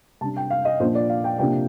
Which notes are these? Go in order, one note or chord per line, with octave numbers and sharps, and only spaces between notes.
C3 G3 D4 A5
G5
F5
D#5
A#2 F3 A#3 D4 C5
D5
F5
G5
C3 F3 A#3 D4 G5